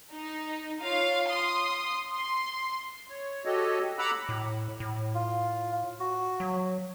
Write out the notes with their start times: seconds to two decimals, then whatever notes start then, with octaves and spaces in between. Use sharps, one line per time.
0.12 D#4
0.81 F4 C#5 F5
1.29 C6 D#6
2.08 C6
3.10 C#5
3.45 F#4 G4 A4 C#5 D#5
3.99 F#5 A#5 B5 D6 E6 F#6
4.29 A2
4.80 A2
5.14 F4
6.00 F#4
6.40 F#3